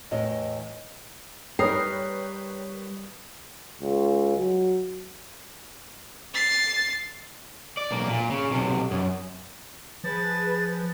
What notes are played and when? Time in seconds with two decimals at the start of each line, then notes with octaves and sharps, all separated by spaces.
0.11 E2 A2 D#5
1.59 G3 D#4 A#4 B4 C#5 G5 D#6 C7
3.80 C#2
4.38 F#3
6.34 A6 C7
7.77 D5
7.91 B1 A#3
8.10 A#2
8.31 C#3
8.51 B1 C3
8.91 F#2
10.04 F3 G#4 B4 A6